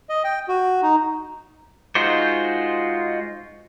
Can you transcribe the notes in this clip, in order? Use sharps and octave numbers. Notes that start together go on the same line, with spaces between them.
D#5
G5
F#4
D#4
G#3 D#4 F4 F#4 C5